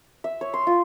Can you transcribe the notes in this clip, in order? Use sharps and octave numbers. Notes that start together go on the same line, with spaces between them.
E5
C#5
C6
F4